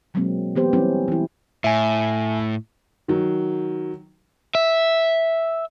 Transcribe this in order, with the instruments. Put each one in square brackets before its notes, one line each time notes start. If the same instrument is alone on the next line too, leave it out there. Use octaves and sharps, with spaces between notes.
[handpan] B2 F#3 G#3 A#3 C4
E3 B3 G4 C5
E3 F#3 G3 C4 C#4 E4
E3 E4
[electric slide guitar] A2 [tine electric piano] E5 G#5
[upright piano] D#3 F#3
[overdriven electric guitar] E5